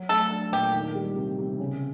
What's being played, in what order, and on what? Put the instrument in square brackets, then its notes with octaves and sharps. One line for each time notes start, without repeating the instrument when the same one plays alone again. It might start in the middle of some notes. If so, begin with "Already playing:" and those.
Already playing: [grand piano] F#3
[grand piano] A3 [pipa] A4
[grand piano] D4
[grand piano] A#2 [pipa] G4
[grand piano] D#3
G3
C3
C3
C#3